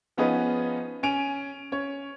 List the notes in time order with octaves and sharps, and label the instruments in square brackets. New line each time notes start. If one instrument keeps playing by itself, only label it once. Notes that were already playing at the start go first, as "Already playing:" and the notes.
[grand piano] F3 B3 C#4 D#4 G#4 B4
C#4 G#5 D7 F7
C#4 C#5